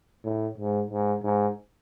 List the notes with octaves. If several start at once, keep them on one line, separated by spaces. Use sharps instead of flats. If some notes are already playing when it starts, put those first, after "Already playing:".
A2
G#2
G#2
G#2